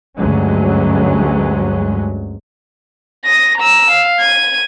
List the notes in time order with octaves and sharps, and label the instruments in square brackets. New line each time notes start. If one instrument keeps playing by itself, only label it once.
[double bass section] D2 G2 F#3 G#3 C#4
[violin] D#6 A#6
A#5 E6
F5
G#6 D#7